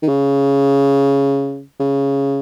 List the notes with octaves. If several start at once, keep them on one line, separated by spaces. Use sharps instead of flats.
D#3
C#3
C#3